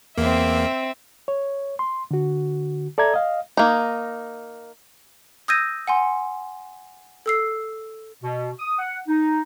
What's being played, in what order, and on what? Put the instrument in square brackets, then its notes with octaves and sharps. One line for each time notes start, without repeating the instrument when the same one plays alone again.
[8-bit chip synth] E2 A#3 [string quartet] C4 E5
[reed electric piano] C#5
C6
D3 F#4
A4 D5 E5 A#5 G#6
D#5 F5
[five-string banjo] A#3 D#4
[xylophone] D#6 E6 G6 G#6 A#6 D#7
F#5 G#5 C6
A4 E6 C7
[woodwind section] B2
D#6
F#5
D#4